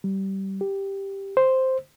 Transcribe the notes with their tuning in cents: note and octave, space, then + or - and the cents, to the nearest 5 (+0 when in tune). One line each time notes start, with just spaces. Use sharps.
G3 -20
G4 +0
C5 +0